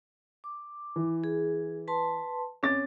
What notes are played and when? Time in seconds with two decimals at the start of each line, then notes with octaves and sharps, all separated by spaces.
0.44 D6
0.96 E3
1.24 G#4
1.88 B4 A5 C6
2.63 C4 C#4 D6 A6